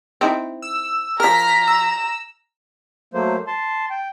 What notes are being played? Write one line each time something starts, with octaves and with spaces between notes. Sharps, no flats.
C4 D#4 E4
E6
F3 A#4 A#5 F6 B6
E6
F#3 A3 A#3 C5
A5 C6
G5